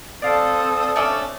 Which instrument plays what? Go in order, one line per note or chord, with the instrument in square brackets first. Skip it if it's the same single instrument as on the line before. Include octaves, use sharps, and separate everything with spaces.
[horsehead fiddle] C4 A4 [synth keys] D5 F5 [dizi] D#6
[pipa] A3 C#4 D4